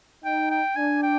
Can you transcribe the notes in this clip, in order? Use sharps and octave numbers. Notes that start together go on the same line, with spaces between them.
D#4 G5
G5
D4 G#5
G5